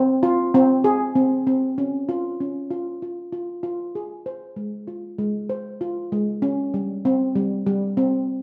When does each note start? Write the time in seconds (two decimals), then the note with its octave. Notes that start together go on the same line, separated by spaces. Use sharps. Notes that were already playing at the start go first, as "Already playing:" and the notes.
Already playing: C4
0.23 F4
0.55 C4
0.84 G#4
1.16 C4
1.47 C4
1.78 C#4
2.09 F4
2.40 C#4
2.71 F4
3.02 F4
3.33 F4
3.63 F4
3.95 G#4
4.26 C5
4.56 G#3
4.88 F4
5.18 G#3
5.50 C5
5.81 F4
6.12 G#3
6.42 C#4
6.74 G3
7.05 C4
7.36 G3
7.67 G3
7.97 C4